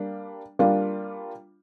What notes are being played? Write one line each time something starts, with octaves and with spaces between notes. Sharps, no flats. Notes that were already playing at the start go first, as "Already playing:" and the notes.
Already playing: G3 A#3 D4
G3 A#3 D4 F4